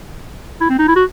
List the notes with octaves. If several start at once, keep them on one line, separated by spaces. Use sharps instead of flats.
E4
C4
D#4
E4
F#4